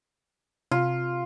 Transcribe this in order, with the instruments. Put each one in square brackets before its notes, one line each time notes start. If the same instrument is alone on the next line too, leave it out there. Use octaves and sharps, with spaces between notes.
[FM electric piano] C3 [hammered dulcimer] F4